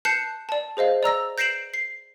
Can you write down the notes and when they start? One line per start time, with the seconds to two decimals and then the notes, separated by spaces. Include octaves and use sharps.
0.05 A5 F#6 G6 C7 C#7 E7
0.49 D5 A5
0.77 G#4 C5 D#5 F5
1.03 D5 A#5 E6 A#6
1.38 G6 A#6 C7 D7 E7 F#7
1.74 C7